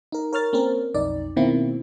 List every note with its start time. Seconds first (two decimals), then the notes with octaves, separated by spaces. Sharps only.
0.12 D#4 A#4
0.33 A#4 C#5 F6 A6
0.53 A#3 C4 C#4 A#4
0.94 B1 F2 D#4 D5
1.36 B2 D#3 A#3 C4 E4